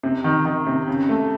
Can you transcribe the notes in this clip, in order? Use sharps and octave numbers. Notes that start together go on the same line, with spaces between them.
C3
D#3
D#3
C3
C#3
A3